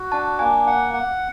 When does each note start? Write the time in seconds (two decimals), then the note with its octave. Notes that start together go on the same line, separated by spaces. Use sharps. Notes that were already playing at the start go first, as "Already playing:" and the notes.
Already playing: F#4
0.12 D4 A5
0.39 A#3 G#5
0.67 F#5
0.94 F#5